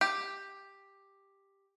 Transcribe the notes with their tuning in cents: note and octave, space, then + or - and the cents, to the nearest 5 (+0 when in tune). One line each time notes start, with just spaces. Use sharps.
G4 +5